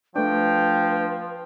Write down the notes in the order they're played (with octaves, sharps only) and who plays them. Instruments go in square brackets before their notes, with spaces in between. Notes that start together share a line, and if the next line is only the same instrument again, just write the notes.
[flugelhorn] F3 [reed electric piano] A3 D4 [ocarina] B4 [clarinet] G5